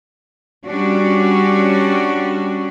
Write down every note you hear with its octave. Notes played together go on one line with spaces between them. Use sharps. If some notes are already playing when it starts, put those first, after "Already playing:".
G3 C#4 D4 F#4